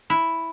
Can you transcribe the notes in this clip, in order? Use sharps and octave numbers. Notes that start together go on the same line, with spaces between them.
E4